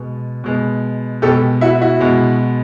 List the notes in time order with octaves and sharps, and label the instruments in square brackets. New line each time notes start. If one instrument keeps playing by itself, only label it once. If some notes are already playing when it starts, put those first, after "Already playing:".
Already playing: [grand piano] B2 G#3 B3
B2 G#3 B3
[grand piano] B2 G#3 B3 [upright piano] G4 A4
[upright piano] E4 F#4
E4 F#4
[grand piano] B2 G#3 B3